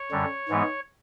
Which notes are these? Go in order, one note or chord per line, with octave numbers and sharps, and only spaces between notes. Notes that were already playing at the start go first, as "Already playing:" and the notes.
Already playing: C#5
F#2 D3 G3
G#2 E3 G#3 B3